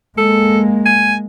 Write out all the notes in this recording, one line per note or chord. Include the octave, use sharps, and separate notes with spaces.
G#3 A#3 A4
G#5